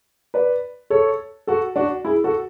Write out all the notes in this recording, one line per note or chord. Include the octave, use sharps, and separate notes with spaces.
B4 D5
A4 C#5
F#4 A4
D4 F#4
E4 G#4
F#4 A4